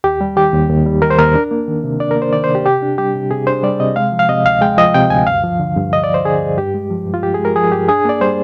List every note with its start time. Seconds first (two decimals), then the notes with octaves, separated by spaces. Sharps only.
0.04 D#2 G4
0.21 G3
0.36 D#3 G4
0.53 D#2
0.69 D#2
0.86 G3
1.02 D#3 A#4
1.10 C5
1.19 D#2 A#4
1.35 D4
1.51 A#3
1.68 D#3
1.84 C3
2.00 D4 D5
2.11 A#4
2.16 A#3
2.22 C5
2.33 D#3 D5
2.44 C5
2.49 C3
2.55 G4
2.66 C3 G4
2.82 D4
2.98 G3 G4
3.15 C3
3.31 C3 G#4
3.47 D4 C5
3.63 G3 D5
3.80 C3 D#5
3.96 G#3 F5
4.12 F3
4.19 F5
4.29 C3 D#5
4.45 D2 F5
4.61 G#3 G5
4.78 F3 D#5
4.94 C3 G5
5.10 D2 G#5
5.27 G2 F5
5.43 F3
5.60 D3
5.76 G2
5.92 G2 D#5
6.03 D5
6.09 F3
6.14 C5
6.25 D3 G#4
6.41 G2
6.58 G2 G4
6.74 G#3
6.90 F3
7.07 G2
7.14 F4
7.23 G2 G4
7.34 G#4
7.39 G#3
7.45 A#4
7.56 F3 G#4
7.72 G2 G4
7.88 D4 G#4
8.05 A#3 D5
8.21 G3 C5